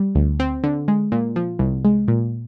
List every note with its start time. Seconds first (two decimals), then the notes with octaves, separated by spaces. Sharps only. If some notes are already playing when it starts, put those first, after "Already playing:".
Already playing: G3
0.15 D2
0.40 C4
0.64 D3
0.88 G#3
1.12 A#2
1.36 F3
1.59 C2
1.85 G#3
2.08 A#2